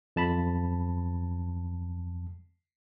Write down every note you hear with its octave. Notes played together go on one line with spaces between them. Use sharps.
F2 A5 B5